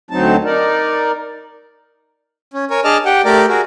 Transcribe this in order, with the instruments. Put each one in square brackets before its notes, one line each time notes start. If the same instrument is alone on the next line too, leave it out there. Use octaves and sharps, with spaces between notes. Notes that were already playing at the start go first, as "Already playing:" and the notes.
[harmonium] D2 F#3 C4 D#4 A5
D#4 A#4 D5
[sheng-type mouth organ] C#4
A#4 C#5 G#5
D4 G#4 D5 D#5 A5 F6
G4 F#5 G5
A3 G4 A#4 D5
F#4 G#4 A#4